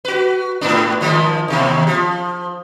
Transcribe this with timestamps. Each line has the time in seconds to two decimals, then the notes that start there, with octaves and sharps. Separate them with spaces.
0.05 F#4 B4
0.61 G#2 B3 D4
1.01 D#3 F3 G#3
1.48 D#2 C3 D#3
1.87 F3